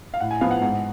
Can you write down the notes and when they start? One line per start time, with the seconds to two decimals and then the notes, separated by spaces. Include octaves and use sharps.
0.14 F5
0.20 A2 F#5
0.31 G#5
0.41 F3 B3 F5
0.51 F#5
0.61 G#2 F#5